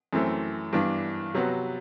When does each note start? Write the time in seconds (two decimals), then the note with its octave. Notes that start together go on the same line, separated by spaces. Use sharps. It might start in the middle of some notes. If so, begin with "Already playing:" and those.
0.13 F#2 E3 A3 C4
0.73 G2 E3 B3 D4
1.34 C3 F#3 B3 F#4